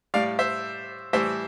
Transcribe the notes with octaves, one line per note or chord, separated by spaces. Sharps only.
A2 G3 D5 F5
C5 E5
A2 E3 G3 C5 E5